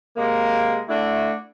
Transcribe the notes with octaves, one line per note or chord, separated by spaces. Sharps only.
C3 G#3 A#3
A3 D4 E4 F#4